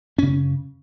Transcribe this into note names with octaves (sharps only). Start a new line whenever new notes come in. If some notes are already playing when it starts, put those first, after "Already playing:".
F#2 C#3 C#4